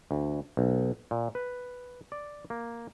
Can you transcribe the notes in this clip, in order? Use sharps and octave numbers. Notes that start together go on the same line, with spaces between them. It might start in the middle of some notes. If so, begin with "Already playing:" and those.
D2
B1
A#2
B4
D5
A#3